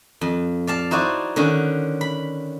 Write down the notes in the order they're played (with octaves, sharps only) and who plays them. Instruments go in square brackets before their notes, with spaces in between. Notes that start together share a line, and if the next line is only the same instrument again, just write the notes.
[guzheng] F2
D5 F5 A5
D#4 E4 F#4 C5 D5
D3 D#3 C#4 F#4
B5